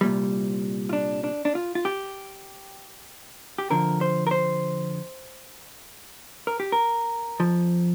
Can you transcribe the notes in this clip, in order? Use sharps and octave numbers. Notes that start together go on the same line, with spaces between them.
C2 A#2 G3
F4
D4
D4
D4
F4
F4
G4
G4
F2 D3 F3 A#4
C5
A#4
C5
A#4
G4
A#4
F2 F3